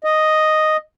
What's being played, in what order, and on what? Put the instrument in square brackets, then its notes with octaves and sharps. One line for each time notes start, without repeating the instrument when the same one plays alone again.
[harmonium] D#5